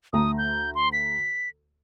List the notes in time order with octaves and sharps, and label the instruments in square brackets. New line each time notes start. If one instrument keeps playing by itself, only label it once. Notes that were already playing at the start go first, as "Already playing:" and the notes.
[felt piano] D2 A3 A#5 [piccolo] D#6
[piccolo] G6
C6
B6